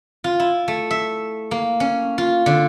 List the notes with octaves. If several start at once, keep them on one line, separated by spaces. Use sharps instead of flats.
F4
E4
A3
E5
A#3
C#4
F4
D3